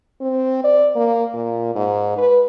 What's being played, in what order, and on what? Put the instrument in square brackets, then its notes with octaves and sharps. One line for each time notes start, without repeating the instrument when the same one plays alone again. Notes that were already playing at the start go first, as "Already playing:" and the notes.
[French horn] C4
D5
A#3
A#2
G#2
B4